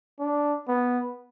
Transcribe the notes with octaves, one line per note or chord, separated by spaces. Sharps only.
D4
B3